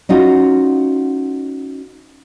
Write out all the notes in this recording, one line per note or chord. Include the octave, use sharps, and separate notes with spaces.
C#4 D#4 F4 F#4